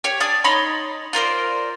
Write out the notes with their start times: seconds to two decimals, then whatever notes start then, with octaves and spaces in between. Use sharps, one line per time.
0.04 G4 C#5
0.20 D4 D5 G#5 D#6
0.44 D#4 C#5 B5 C6
1.13 F4 A#4 C5 D5